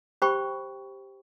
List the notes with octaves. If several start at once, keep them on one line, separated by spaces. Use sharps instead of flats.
G4 C5 G5 B5 C#6